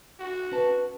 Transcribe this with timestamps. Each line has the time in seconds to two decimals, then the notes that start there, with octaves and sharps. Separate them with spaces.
0.20 F#4
0.52 C#4 B4 A5